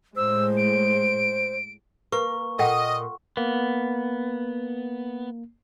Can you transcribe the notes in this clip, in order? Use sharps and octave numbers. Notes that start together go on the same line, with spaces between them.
A2 G#3 C5 E6
D7
A#3 B4 C#6
A#2 A4 D#5 F#5 G5
A#3 B3